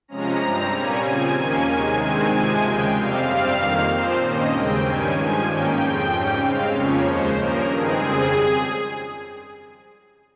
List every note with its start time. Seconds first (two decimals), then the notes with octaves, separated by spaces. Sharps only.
0.08 C3 F3 G#3 C#4 A#5
0.39 G2 G3 C4
0.71 A#2 G3 A#3 C#4 G#5
1.03 C#3 F3 C4 G#5
1.35 D#2 D#3 A#3 C#4 G#5
1.66 C3 D#3 G#3 G#5
1.98 G2 D#3 G#3 C4 G#5
2.29 C3 F3 G#3 G#5
2.61 D#2 C#3 G#3 G5
2.92 F2 C3 G3 C4 F5
3.24 G2 G3 C4
3.56 F2 D#3 A#3
3.87 A#2 F3 C4 C5
4.19 G2 D#3 A#3 C#4 D#5
4.50 D#2 C#3 G#3 C4 G5
4.82 G2 D#3 G3 C#4 G#5
5.13 G2 F3 G#3 G#5
5.45 G#2 D#3 A#3 C#4 G5
5.76 F2 C#3 F3 C4
6.08 G#2 G3 C#4
6.40 C#3 G#3 C4 F5
6.71 F2 C#3 F3 A#3 C#4 C#5
7.03 D#2 C#3 G#3 C5
7.34 G2 F3 A#3 C#4 A#4
7.66 G2 D#3 G#3 C4 G#4
7.97 F2 C#3 G3 C4